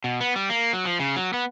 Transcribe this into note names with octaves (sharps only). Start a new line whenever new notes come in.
B2
B3
G3
A#3
F#3
F3
C#3
F#3
B3